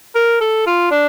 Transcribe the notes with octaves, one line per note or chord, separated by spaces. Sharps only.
A#4
A4
F4
D4